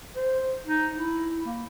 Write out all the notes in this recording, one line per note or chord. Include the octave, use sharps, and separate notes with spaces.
C5
D#4
E4
A#3